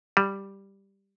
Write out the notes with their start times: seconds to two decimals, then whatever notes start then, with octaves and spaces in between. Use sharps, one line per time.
0.17 G3